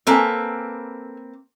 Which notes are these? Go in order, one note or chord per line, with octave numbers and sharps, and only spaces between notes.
A#3 C4 A4 B4 G#5